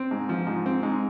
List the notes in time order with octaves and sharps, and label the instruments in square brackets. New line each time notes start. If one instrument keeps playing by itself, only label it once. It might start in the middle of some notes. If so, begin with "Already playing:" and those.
Already playing: [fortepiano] C4
G#2
F3
G#2
C4
G#2